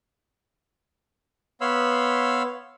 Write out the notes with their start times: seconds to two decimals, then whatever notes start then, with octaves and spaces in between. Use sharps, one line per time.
1.61 B3 C#5 F5 B5 C6 E6